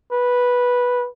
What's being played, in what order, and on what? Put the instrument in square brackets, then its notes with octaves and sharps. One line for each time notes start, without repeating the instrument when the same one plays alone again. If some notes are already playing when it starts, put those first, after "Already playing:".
[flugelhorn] B4